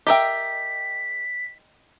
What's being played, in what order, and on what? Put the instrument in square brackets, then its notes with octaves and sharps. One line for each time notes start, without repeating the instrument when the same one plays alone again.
[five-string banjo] G4 A#4 E5 [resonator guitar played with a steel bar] D#5 G5 [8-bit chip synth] B6